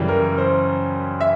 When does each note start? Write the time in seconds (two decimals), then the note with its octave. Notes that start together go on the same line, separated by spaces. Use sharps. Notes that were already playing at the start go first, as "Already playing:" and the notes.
Already playing: F#2 C#3 E3 G3
0.08 A#4
0.38 C5
1.21 E5